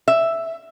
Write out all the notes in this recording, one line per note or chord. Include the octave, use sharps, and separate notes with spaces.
E5